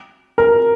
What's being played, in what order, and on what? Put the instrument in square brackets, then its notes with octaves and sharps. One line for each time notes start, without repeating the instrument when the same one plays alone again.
[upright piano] A#4